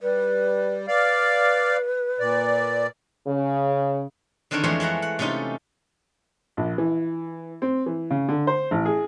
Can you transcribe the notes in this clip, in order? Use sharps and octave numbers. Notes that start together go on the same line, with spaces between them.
G3 B4
B4 D5 F5
A#2 D5
C#3
D3 D#3 C4 D4 A#4 C#5
F2 E3 G#3 A3 C5 C#5
G#3 A3 F#5 A#5
F#5
C3 A3 C#4 D#4 F4
A#1
E3
C4
E3
C#3
D3
C5
A1
G#4